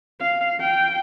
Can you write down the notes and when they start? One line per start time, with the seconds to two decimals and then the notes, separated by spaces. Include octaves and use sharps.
0.21 F5
0.60 G5